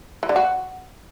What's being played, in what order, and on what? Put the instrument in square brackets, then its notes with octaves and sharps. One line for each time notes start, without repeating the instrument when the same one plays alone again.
[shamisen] E3
D3
F#4